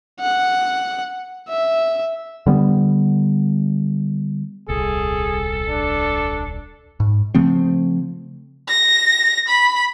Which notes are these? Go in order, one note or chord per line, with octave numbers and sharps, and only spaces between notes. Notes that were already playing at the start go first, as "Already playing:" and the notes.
F#5
E5
D3 G3 B3
D#1 C2 G#4 A4
D4
G#2
C#3 F3 A3 C4
A#6
B5